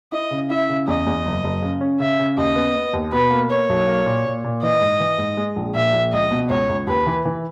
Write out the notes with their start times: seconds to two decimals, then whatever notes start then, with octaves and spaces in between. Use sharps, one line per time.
0.12 E4 D#5
0.31 C#3
0.50 E4 E5
0.69 C#3
0.88 E2 D#5
1.07 E2
1.25 F#1
1.44 F#1
1.62 C#3
1.81 C#4
2.00 C#3 E5
2.19 C#3
2.37 D#2 D#5
2.56 B3
2.75 B3
2.93 D#2
3.12 B2 B4
3.31 A#3
3.50 A#3 C#5
3.69 B1
3.87 A#3
4.06 A#2
4.25 A#2
4.44 A#2
4.62 E3 D#5
4.81 G#2
5.00 E3
5.18 G#2
5.37 G#3
5.56 A#1
5.74 A#2 E5
5.94 A#1
6.13 C#2 D#5
6.31 B2
6.50 C#2 C#5
6.69 C#2
6.87 D#2 B4
7.07 E3
7.25 E3